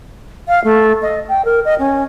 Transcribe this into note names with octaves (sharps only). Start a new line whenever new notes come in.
F5
A3
D#5
G5
A#4
D#5
C#4